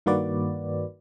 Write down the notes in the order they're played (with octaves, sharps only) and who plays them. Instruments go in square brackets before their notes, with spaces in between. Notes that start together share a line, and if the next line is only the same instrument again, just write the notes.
[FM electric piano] G2 D#3 A#3 F#4 B4 D5